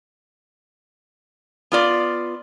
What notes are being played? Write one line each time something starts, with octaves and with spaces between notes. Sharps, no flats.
B3 F4 D5